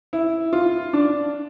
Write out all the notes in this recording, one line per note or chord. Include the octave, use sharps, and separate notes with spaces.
E4
F4
D4